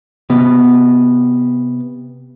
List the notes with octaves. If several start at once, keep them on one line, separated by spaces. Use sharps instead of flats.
C3 B3